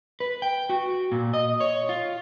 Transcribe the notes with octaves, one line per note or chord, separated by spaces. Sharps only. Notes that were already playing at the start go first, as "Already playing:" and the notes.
B4
G5
F#4
A#2
D#5
C#5
F4